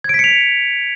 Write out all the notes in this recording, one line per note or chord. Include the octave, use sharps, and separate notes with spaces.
G#6 B6 C#7 D7 F7